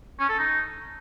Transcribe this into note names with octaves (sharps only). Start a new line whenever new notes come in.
C#4
A4
D#4